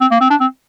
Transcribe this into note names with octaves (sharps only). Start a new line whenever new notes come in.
C4
A#3
C4
D4
C4